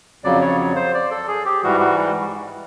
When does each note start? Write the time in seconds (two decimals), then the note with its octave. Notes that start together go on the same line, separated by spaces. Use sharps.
0.24 F2 C#3 F#3 D5
0.41 C#5
0.76 C5
0.94 D5
1.11 A4
1.28 G#4
1.45 G4
1.63 G#2 E3 G3 F#4
1.80 F#4